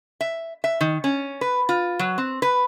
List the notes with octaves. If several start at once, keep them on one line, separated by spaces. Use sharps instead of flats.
E5
E5
D#3
C#4
B4
F4
F#3
C4
B4